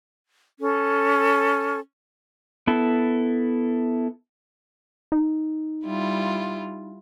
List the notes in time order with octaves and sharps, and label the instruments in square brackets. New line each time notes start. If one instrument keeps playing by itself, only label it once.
[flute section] C#4 A4
[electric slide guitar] B3 E4 A4
[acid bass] D#4
[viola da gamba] G3 E4 F4